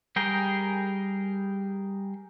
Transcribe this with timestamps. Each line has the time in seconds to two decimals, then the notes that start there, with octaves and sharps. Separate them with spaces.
0.16 G3 G#4 A#4 G5